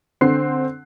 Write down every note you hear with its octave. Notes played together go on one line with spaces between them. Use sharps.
D3 C4 C6 F#6 C7